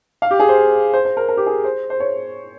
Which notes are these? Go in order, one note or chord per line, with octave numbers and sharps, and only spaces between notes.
F5
G4
G#4
C5
C5
C5
A#4
A#4
G4
G#4
C5
C5
C#5